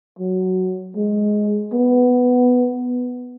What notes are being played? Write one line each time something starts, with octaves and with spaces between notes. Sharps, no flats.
F#3
G#3
B3